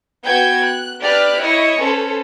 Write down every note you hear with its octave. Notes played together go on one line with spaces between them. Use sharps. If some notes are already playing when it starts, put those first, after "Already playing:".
B3 F#4 G5 G6 G#6
F#6
D4 G4 B4 D5 F6 F#6
E4 C#5 D#5 C#6
C#4 A4 B4 C5